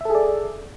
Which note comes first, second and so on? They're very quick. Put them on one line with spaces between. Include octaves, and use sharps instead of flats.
E5 A4 G#4 D5